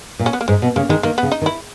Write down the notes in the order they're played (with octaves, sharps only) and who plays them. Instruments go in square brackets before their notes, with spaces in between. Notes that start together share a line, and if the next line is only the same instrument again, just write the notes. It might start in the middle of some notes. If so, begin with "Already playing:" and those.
[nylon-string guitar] A#2
[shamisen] C#4
B3
A#3
[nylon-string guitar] G#2 [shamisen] G#3
[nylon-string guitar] B2
[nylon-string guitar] C#3 [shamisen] A#3
[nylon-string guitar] D#3 [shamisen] G#3
[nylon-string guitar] D#3 [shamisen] A#3
[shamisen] B3
[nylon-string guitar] C#3
[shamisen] D#4
[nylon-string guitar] D#3
[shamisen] E4